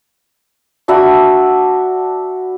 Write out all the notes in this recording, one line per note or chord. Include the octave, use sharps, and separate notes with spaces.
D4 F#4 E5 B5